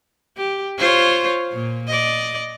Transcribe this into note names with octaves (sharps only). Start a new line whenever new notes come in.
G4
F4 C5 C#5
A#2
D5 D#5